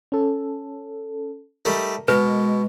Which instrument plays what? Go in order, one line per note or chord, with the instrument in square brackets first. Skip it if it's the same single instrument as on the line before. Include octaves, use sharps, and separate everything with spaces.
[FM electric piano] C#4 A4
[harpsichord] G3 A3 D#4 [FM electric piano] A#4
[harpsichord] B2 [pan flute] G#3 [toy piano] B4